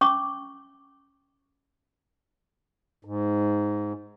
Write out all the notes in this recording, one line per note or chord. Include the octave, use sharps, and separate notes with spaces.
C#4 C#6 D6
G#2